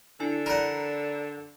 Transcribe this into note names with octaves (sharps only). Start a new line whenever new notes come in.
D3 D4 E4 G#5
A#4 D5 F#5 A#5 B5